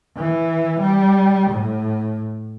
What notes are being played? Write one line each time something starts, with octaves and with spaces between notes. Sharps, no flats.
E3
G3
A2